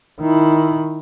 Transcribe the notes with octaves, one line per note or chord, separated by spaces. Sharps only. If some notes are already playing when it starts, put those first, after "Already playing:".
D#3 E4